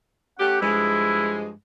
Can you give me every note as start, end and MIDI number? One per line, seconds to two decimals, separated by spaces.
0.39 0.61 57
0.39 0.61 61
0.39 0.61 67
0.39 0.58 78
0.61 1.51 43
0.61 1.51 53
0.61 1.51 56
0.61 1.39 64